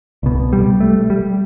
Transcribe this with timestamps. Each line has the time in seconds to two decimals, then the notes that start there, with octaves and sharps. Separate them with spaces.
0.23 C2 B2
0.53 G3
0.80 A3
1.10 G3